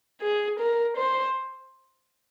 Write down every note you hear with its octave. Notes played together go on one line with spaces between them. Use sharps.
G#4
A#4
C5